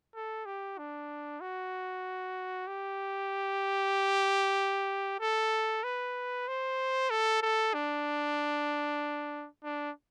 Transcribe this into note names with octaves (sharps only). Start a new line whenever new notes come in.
A4
G4
D4
F#4
G4
A4
B4
C5
A4
A4
D4
D4